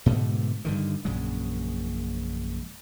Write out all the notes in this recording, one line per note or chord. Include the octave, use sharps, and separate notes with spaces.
G#2 B2 D3 A3
G2 D3 D#3
A#1 F#2 C#3 G#3